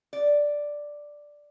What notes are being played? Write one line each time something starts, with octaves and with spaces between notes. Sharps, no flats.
D5